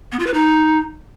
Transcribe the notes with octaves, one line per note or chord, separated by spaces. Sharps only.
B3
F4
B4
D#4